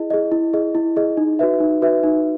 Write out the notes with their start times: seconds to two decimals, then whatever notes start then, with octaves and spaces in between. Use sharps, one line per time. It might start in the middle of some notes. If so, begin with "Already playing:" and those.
Already playing: E4 G#4 D#5
0.10 G#4 D#5
0.32 E4
0.53 G#4 D#5
0.75 E4
0.96 G#4 D#5
1.17 D#4
1.39 F#4 B4 E5
1.60 D#4
1.82 F#4 B4 E5
2.03 D#4